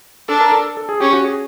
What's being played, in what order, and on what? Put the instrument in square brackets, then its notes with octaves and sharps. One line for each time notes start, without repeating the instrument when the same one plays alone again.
[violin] D4 [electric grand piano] A4
[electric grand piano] A#4
A4
A4
G#4
[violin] C#4 [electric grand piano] G4
[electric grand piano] F#4
G#4